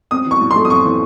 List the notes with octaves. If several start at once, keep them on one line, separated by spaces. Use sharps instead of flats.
C4 D#6
E3
C#6
A2
C6
A3
D#6
C4 C#6
E3